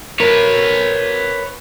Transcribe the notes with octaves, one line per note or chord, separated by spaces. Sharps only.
A#4 B4 C#5